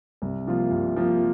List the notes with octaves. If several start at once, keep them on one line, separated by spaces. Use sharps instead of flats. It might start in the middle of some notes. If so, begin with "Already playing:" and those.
C2
C3 F3 A#3 F4
C2
C3 F3 A#3 F4